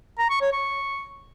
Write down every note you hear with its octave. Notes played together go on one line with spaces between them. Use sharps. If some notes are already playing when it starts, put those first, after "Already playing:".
A#5
C#6
C#5
C#6